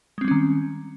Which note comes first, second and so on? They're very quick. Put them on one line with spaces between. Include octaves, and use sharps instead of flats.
G#3 C4 G3 C#4 D#3